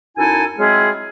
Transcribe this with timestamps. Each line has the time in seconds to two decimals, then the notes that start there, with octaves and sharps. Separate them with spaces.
0.17 F#2 D#4 E4 A4 G#5
0.58 F#3 G#3 C4 E4 F4 G#4